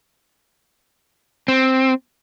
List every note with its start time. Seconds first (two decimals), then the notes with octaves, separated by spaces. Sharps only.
1.48 C4